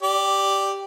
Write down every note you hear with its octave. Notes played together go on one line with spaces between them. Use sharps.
G4 D5